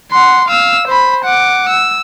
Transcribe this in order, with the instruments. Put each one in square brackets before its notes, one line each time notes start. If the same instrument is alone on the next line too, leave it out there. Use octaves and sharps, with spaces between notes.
[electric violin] F#5 C6
F5 E6
C5 B5
F#5 D6
E6